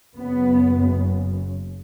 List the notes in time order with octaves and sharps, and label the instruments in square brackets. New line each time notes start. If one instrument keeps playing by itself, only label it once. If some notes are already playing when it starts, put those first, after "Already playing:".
[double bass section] F#1 F#2 C#3 B3